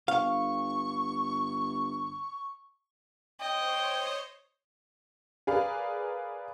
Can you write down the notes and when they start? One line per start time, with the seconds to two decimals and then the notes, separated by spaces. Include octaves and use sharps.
0.08 G1 F5 C#6
3.41 C5 C#5 D#5 G5
5.47 G#4 A#4 B4 D5 F5